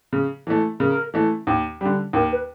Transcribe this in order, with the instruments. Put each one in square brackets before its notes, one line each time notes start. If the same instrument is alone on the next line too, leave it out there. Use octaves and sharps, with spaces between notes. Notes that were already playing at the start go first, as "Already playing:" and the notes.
[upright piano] C#3
E3 A3
[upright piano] C#3 [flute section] A#4
[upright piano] E3 A3
D#2
D3 G3
[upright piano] D#2 [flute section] A#4
[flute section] B4